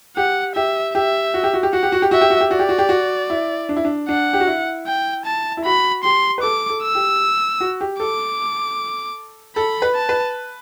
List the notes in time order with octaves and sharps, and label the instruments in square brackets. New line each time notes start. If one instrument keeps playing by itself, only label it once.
[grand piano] G4 [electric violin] F#5
[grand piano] G4 [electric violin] E5
[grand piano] G4 [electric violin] E5
[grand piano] F#4
G4
F#4
G4
[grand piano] F#4 [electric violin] F#5
[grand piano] G4
F#4
G4
[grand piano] F#4 [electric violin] E5
[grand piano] G4
F#4
G4
[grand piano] F#4 [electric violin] D5
[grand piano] G4
F#4
G4
F#4
E4
D4
E4
D4
[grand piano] D4 [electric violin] F#5
[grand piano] G4
F#4
E4
[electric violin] G5
A5
[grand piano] E4
[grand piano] F#4 [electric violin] B5
[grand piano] G4 [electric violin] C6
[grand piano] B4
[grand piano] A4 [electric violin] D6
[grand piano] A4
[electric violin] E6
[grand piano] G4
F#4
G4
[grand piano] A4 [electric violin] D6
[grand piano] A4 [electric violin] B5
[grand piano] B4
[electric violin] A5
[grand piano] B4